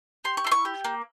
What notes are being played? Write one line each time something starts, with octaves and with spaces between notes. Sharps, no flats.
G4 C6
C#6
E4 C6
C#6
G4
A#3